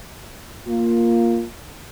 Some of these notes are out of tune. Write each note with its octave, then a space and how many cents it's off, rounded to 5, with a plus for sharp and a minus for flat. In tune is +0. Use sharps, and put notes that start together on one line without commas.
A#3 +0 F4 +0